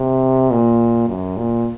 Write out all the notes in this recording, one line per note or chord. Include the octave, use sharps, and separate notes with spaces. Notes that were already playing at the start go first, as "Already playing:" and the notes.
Already playing: C3
A#2
F#2
A#2